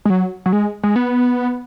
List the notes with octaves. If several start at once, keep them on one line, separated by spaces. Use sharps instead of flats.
G#3
F#3
F#3
G#3
G#3
B3